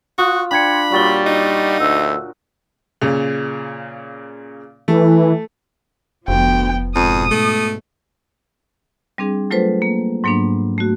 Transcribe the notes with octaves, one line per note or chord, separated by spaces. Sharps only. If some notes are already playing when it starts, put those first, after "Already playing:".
F4 F#4 C#6 D#6 F#6
D4 G5 B5 C6 G#6 C#7
A#2 F#3 G3 C#6 A6 G7
D#4
D2 E5 E6
A#2 C#3
E3 A3
F1 D2 F3 B3 G5
F2 G#2 B2 D#6
A3
G3 C4 D4 G#4
F#3 A3 F4 A4 B4 C5
A#3
G#2 F#3 A#3 B3 D4
A3 F#4